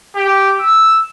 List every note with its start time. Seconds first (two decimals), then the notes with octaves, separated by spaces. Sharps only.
0.16 G4
0.60 E6